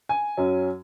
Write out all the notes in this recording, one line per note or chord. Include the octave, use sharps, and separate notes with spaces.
G#5
F#2 F#3 C#4